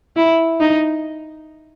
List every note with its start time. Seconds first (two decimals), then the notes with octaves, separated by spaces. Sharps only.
0.16 E4
0.60 D#4